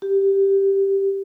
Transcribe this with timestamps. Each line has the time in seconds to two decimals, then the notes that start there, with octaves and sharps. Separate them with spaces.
0.02 G4